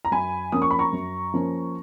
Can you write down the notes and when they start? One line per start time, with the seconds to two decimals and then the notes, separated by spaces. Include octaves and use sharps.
0.05 A#5
0.12 F#2 G#5 B5
0.52 F3 A#3 C#4 D#6
0.62 C#6
0.71 B5
0.79 A#5 C#6
0.92 F#2
1.34 F3 A#3 C#4